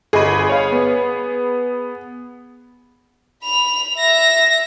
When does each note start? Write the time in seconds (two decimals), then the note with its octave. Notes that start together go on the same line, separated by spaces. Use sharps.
0.13 G1 G#4 D#5 B5 D#7
0.49 C#5 F5
0.72 B3
3.43 B5 F7
3.97 E5 A#6